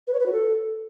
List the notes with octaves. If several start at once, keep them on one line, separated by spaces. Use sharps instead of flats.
B4
C#5
B4
F#4
A4